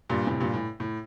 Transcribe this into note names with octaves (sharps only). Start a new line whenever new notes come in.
G2 A#2
A2 C3
G2 A#2
A2
A2